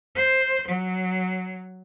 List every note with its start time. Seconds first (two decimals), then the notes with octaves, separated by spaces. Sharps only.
0.15 C5
0.68 F#3